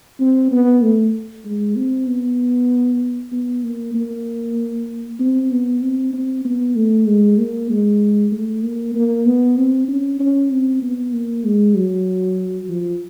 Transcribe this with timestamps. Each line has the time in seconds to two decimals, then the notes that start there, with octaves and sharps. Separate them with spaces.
0.20 C4
0.51 B3
0.82 A3
1.45 G#3
1.76 C4
2.07 B3
3.32 B3
3.63 A#3
3.95 A#3
5.20 C4
5.51 B3
5.82 C4
6.13 C4
6.45 B3
6.75 A3
7.07 G#3
7.38 A#3
7.70 G#3
8.32 A3
8.63 A#3
8.95 A#3
9.26 B3
9.57 C4
9.88 C#4
10.19 C#4
10.50 C4
10.82 B3
11.13 A#3
11.45 G#3
11.75 F#3
12.69 F3